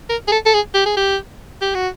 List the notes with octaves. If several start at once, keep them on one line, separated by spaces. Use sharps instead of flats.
A#4
G#4
A4
A4
G#4
G4
G#4
G4
G4
F#4